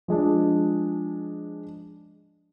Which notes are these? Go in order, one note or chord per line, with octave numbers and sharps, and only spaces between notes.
F3 G#3 D4